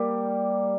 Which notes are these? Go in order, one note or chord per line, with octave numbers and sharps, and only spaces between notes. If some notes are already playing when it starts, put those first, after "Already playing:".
Already playing: G3 A#3